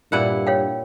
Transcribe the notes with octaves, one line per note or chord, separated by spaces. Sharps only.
G2 A#2 E4 F#5
C#5 F5 G5